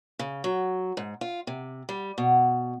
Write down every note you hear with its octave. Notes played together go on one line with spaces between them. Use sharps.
C#3
F#3
G#2
F4
C3
G3
B2